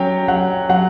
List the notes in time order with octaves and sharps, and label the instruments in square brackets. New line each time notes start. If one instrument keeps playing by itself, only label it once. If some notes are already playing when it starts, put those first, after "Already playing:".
Already playing: [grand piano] F#3 C#4 [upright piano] G5
[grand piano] F#3 [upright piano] F#5
[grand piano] F#3 [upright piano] F#5